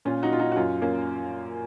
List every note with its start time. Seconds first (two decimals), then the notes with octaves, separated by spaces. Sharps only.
0.05 A#2 C#4 F4
0.23 D#4 F#4
0.31 A#2 F4
0.40 D#4 F#4
0.52 F#4
0.56 F#2 C#4 F4
0.82 A#3 C#4